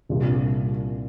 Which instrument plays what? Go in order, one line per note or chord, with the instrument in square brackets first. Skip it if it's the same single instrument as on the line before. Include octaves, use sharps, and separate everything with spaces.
[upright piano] C2 A#2 G3 D4 F4